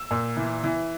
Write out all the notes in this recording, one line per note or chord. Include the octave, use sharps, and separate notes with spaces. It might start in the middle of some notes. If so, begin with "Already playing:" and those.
Already playing: E6
A#2
E3
E3